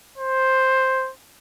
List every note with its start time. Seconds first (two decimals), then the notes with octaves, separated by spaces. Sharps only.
0.18 C5